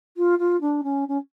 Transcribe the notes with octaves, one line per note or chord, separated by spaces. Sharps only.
F4
F4
D4
C#4
C#4